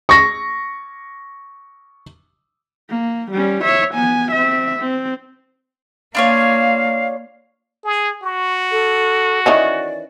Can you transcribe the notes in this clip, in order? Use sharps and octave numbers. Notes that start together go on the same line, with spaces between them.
C#6 A#6
A#3
G3 C#4
C#5 E5
B3 G#5
C4 E5
C4
A#3 D4 F4 C#5 F5
G#4
F#4 C#6
A4
D#3 E3 C#4 D5